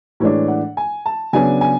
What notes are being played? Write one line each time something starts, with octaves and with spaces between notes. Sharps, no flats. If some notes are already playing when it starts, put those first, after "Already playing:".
A2 E3 G#3 D4 C#5
F#5
G#5
A5
C#3 F#3 B3 D4 G#5
G#5